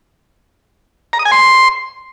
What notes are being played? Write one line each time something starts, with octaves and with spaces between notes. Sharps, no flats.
A#5
D#6
G#5
C6